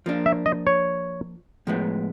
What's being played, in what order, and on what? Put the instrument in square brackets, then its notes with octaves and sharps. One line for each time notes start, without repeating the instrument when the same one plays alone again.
[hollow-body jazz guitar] F3 A#3 D4
[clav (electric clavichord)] E5
D#5
C#5
[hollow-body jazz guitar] A2 F3 G#3 B3